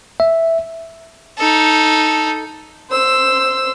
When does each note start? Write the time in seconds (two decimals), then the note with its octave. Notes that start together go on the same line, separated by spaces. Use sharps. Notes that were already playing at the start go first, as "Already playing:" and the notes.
0.20 E5
1.38 D#4 A4
2.90 C5 E6